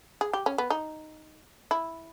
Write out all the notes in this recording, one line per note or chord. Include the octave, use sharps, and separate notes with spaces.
G#4
G4
C#4
B3
D#4
E4